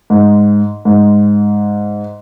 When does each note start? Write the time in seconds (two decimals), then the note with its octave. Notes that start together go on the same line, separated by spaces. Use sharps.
0.10 G#2
0.85 G#2